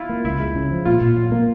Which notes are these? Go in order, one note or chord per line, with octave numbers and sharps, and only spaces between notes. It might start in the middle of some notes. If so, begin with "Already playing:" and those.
Already playing: E4 F4
A#3
C#2 E4
G#3
C#3
F3
A#2 F4
A#2
F#3
A#3